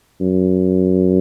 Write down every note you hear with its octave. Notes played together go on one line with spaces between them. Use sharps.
F#2